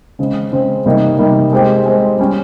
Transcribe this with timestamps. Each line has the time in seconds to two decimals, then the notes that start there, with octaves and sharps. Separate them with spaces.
0.19 C#3 G#3 C4
0.52 C#3 G#3 C4
0.86 C3 G3 A#3 D#4
1.18 C3 G3 A#3 D#4
1.53 G#3 C4 G4
1.86 G#3 C4 G4
2.19 G3 C#4 G4